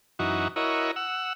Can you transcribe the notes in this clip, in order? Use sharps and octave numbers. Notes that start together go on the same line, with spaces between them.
F#2 E3 D#4 F#4
E4 F#4 A#4 C#5 D#5
F#5 E6